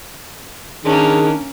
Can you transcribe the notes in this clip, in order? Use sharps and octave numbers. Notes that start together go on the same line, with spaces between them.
D#3 A#3 C#4 D4 G#4